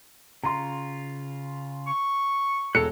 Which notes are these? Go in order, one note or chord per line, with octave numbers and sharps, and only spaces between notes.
C#3 F4 A#5 C6
C#6
E1 A4 C#5 A#5 F#6 C#7